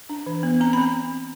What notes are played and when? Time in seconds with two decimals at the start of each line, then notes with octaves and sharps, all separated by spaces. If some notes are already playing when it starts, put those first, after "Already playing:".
0.09 D4
0.26 E3
0.43 B3
0.61 C4 A#5
0.73 B5
0.78 C4